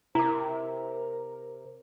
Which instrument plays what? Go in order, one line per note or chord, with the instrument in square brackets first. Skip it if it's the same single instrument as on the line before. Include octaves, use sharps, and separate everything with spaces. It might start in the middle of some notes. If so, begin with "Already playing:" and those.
[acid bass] C3 [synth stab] E4 [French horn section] A#4 [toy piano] A#5 D6